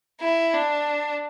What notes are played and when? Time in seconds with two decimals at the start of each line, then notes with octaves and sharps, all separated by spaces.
0.21 E4
0.54 D4